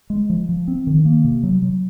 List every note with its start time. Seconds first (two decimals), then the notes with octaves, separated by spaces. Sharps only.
0.10 G#3
0.30 F3
0.49 F3
0.68 C4
0.87 D#3
1.05 A#3
1.24 C3
1.43 F#3
1.62 F#3